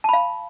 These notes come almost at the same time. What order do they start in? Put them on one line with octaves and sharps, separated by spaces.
A5 B5 F5